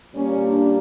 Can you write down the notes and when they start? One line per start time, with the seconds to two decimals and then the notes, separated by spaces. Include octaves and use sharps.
0.15 A#2 G3 A#3 C#4
0.44 D4